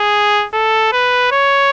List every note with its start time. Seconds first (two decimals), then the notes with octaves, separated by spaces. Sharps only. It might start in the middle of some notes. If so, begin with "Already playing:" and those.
Already playing: G#4
0.54 A4
0.92 B4
1.32 C#5